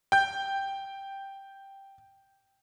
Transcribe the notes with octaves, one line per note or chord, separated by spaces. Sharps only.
G5 G6